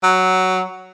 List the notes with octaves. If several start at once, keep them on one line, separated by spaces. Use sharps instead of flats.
F#3